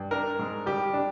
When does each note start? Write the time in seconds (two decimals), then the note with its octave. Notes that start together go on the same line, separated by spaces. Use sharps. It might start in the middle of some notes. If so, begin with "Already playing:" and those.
Already playing: G2
0.11 D4 A#4
0.39 G#2
0.66 G3 G4
0.94 D4